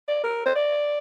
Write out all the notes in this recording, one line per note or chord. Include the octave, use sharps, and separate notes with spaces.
D5
A#4
C5
D5